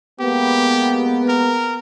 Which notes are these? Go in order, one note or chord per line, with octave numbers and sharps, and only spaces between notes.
G#3 A#3 B3 G4
A#4